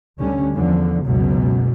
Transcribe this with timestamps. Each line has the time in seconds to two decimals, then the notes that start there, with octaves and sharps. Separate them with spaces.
0.19 D2 D3 G3 C#4
0.55 E2 D3 F3
1.05 F#1 C#2 F#2 B2 F#3